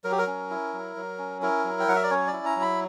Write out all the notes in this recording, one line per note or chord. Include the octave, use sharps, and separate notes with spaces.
F#3 A#4
G4
A#4
C#4
E4
F#3
F#3
C#4
E4 A#4
F#3
G5
F#3 F#5
E5
D5
C#4 C#5
D5
E4
A#5
F#3
B5